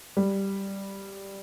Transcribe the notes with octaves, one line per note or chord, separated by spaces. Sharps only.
G3